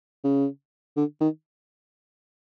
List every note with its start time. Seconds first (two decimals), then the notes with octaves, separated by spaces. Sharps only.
0.24 C#3
0.96 D3
1.21 D#3